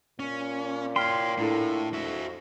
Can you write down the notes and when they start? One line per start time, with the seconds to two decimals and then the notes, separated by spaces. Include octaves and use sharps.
0.20 A#2 C#4
0.96 C#5 G5 C6 F6 B6
1.38 A2 D4 E4 A4
1.94 F2 F#4 E5